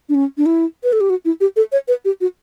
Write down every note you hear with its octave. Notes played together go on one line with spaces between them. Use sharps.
D4
C#4
D4
E4
B4
A4
G4
F#4
E4
G4
A4
C#5
B4
G4
F#4